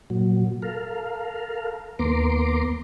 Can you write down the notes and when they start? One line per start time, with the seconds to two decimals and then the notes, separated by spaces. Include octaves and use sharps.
0.10 A#2 F#3
0.62 A4 A#4 F5
1.99 D#2 A#3 B3 A#5 C6 D6